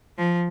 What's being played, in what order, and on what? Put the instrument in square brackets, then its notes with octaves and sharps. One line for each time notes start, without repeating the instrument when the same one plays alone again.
[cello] F3